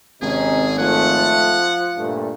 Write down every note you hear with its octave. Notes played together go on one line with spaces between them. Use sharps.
G#1 C3 C#4 D#4 G#4
F3 A3 F#5
G2 A#2 A3